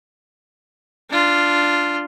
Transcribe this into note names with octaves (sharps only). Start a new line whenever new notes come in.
D4 F4